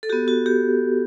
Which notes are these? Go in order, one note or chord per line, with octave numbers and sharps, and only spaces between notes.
A4
B3 F#4 G4
F#4
G4